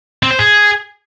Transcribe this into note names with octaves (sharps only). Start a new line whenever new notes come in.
C4
C5
G#4